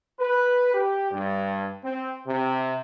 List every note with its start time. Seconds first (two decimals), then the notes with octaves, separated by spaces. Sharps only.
0.20 B4
0.74 G4
1.10 G2
1.84 C4
2.26 C3